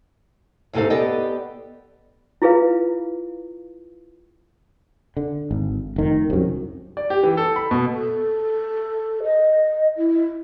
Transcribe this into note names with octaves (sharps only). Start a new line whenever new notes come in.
D#2 G#2 C3 D#4 A4 F5
B3 G4 A4 D5 D#5 G5
E4 F4 G#4 B4 F5
D3
G#1
F1 D#3
C2 F#2
D5
G4
E3
A4
B5
B2
A4
D#5
E4